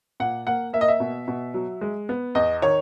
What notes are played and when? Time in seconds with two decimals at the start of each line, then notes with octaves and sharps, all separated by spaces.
0.20 A#2 F#5
0.47 A#3 F#5
0.73 A#3 E5
0.81 D#5
0.88 E5
1.00 B2
1.28 B2
1.54 F#3
1.81 G#3
2.09 B3
2.35 E2 D#5
2.62 D#3 C#5